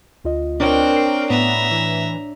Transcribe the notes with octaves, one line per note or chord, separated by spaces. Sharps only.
D2 F4 D#5
C4 D4 A#4 C#5 G5
C7
A2 B3 E5 A#5
E3